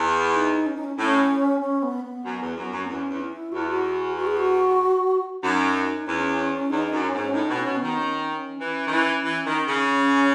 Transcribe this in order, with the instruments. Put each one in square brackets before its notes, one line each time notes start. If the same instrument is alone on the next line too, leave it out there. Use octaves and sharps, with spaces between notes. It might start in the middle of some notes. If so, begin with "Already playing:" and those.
Already playing: [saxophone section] E2
[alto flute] D#4
C#4
D#4
C#4
[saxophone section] A2 [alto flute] C#4
[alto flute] C#4
B3
B3
[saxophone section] F#2
E2
F#2
F#2
[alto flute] B3
[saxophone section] E2 [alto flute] C#4
[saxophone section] E2
[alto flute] E4
[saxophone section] E2 [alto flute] F#4
[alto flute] E4
F#4
F#4
G#4
F#4
[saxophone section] F#2 [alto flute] D#4
[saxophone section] E2 [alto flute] C#4
[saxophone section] E2 [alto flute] D#4
[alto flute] D#4
[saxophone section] F#2
[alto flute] C#4
[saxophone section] G#2
[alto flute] C#4
[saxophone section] A2 [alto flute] D#4
[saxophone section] B2
[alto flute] C#4
[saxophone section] B2
[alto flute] B3
[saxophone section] D#3
[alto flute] C#4
C#4
[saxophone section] E3 [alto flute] C#4
[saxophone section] D#3
E3
E3
D#3
C#3
[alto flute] C#4